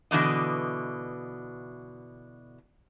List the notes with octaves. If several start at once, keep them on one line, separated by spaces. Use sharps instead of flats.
B2 D3 E3 D#5